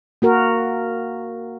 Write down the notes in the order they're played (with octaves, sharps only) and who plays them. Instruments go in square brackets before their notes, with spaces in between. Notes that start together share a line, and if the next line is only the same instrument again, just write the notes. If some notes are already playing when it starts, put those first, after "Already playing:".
[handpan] A#3 F#4 A#4